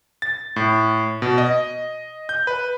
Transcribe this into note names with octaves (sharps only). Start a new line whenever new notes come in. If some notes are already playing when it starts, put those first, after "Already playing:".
A6
A2
B2
D#5
G6
B4